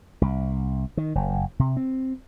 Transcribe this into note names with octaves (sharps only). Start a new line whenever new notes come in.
C2
D#3
F#1
C3
C4